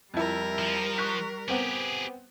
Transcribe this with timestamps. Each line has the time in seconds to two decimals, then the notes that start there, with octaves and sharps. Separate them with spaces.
0.14 F2 G3 E4 A#4
0.59 F3
0.98 C#6 F#6 B6
1.48 B3 C4 G4 G#4